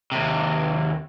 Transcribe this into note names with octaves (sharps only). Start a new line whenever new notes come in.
D#2 C3